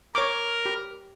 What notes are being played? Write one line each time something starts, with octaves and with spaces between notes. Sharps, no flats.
A#4 C#5 D6
G4